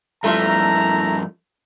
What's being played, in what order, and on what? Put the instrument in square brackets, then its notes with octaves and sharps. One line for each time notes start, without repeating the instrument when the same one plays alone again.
[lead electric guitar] G2 F3 [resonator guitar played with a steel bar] A3 F4 E5 [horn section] E4 A5 A#5